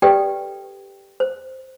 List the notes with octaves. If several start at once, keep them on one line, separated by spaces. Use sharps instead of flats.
G4 A4 B4 D5 G5
C5